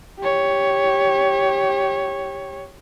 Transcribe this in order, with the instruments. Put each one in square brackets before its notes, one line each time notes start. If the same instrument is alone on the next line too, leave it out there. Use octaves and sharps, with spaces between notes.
[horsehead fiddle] G4 C#5